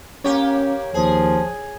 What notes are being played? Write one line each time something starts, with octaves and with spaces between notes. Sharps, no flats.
A#3 C#4 G4 C#5
D#2 F3 G#4